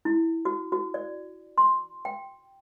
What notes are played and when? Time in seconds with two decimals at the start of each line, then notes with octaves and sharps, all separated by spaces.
0.05 E4
0.45 F#4
0.72 F#4
0.94 D5
1.58 C6
2.05 G5